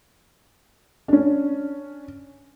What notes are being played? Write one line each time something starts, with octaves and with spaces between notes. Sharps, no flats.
C#4 D4